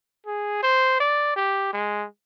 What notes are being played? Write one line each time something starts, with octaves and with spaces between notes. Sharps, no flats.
G#4
C5
D5
G4
G#3